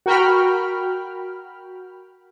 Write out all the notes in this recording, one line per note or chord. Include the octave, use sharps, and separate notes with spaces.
F#4 A#4 G5 B5 F6